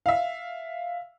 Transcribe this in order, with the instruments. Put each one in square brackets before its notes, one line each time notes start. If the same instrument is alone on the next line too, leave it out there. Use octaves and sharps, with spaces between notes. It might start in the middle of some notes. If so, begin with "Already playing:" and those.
[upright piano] E5 F5